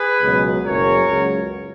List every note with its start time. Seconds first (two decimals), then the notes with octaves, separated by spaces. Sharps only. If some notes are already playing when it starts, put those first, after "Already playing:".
Already playing: G#4 B4
0.23 C#2 B2 F#3
0.65 F#1 F#2 C#3 A#4 C#5
1.09 C#2 C#3 F#3